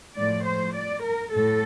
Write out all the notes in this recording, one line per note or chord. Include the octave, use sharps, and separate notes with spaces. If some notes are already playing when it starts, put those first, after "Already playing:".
A2 F3 D5
C5
D5
A#4
A2 A4